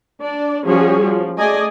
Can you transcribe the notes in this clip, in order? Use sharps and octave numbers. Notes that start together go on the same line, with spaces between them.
D4 D5
F3 G3 C#4 F#4 G#4
F3
A3 G#4 D5 D#5 G#5